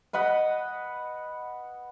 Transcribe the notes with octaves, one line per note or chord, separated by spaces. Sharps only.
B4 D#5 F#5 B5